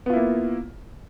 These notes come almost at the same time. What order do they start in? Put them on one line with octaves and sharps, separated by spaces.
B3 F4 E4 A#3